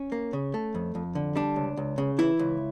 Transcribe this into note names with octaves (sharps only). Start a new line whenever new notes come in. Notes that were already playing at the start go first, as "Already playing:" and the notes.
Already playing: C#4
A#3
C#3
A3
F2
F2
D3
G3 D4
C#2
C#2
C#3
E3 E4
C#2